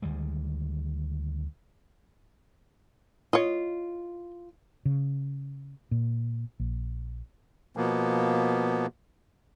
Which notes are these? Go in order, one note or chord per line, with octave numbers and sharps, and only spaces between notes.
D2 D#3 G3 G#3
F4 C#5 D#5
C#3
A#2
A#1
B2 F3 A#3 B3